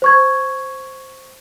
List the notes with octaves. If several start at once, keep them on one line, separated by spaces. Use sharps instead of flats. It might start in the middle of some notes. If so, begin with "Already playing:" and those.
C5 C#6 G#6